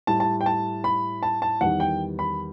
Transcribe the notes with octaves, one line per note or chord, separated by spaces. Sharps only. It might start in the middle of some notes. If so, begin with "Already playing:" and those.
A2 G3 A5
A5
G5
A5
B5
A5
A5
E2 D#3 G3 F#5
G5
B5